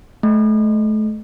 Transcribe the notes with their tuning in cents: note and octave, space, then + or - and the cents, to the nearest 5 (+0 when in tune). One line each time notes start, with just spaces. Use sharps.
A3 -35